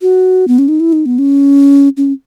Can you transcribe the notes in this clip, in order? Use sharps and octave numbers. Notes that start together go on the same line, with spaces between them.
F#4
B3
C#4
D#4
E4
D#4
B3
C#4
C#4